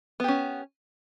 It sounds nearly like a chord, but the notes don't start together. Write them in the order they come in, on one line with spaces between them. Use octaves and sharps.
B3 G4 C#4